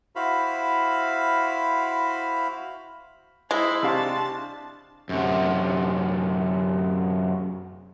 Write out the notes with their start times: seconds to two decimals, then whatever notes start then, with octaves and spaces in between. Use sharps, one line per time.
0.16 E4 F#4 C5 F5 B5
3.51 G#3 E4 C5
3.83 C3 D4 G4 F5 A5 C6 C#6
5.09 F#2 C3